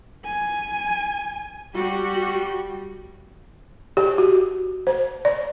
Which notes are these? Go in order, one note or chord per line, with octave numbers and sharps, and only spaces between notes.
G#5
G3 F#4 G4
G4
F#4
C5
D5